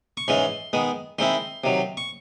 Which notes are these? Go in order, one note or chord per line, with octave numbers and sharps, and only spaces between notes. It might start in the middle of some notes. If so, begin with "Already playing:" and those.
C#6
G#2 E3 G#3 C#4 C6
D#3 G#3 B3
D#3 G#3 C4 E4 C6
C3 D#3 F#3
C#6